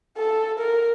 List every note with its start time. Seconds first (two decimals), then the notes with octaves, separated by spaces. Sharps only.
0.18 A4
0.59 A#4